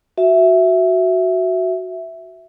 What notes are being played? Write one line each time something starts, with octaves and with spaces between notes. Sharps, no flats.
F#4 E5